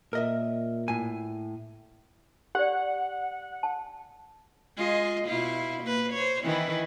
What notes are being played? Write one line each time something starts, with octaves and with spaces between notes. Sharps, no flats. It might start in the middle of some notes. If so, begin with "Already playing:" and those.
A#2 A#4 D#5 E5
A2 G#5
G4 D5 F#5
A5
G#3 F4 D#5
B2 E4 F4
A#3 B4
C5 C#5
D#3 E3 E4